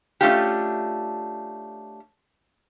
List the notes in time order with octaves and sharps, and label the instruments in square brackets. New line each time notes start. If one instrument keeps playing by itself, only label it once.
[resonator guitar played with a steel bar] A3 C#4 D4 F4 G4